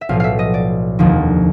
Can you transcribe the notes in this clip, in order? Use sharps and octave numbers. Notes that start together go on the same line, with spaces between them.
E5
B1 A2 F3 F5
E5 F5
D#5
D5
F1 D#2 D3 F3